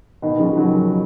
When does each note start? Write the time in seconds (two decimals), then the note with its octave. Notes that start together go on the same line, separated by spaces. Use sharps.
0.22 B2 D#3
0.39 C#3 F3
0.56 D#3 F#3